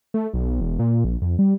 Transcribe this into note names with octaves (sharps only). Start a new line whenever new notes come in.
A3
B1
E1
A#2
A#1
F2
G3